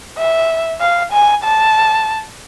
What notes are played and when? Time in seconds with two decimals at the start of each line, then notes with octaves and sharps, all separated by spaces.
0.18 E5
0.81 F5
1.13 G#5
1.44 A5